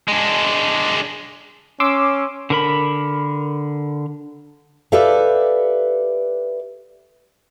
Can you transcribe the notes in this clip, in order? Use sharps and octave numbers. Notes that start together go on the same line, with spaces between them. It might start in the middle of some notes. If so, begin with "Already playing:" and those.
G#3 D4
C#4 C6 D6 E6
D3 A#4 B5
G4 A4 B4 D5 E5 F5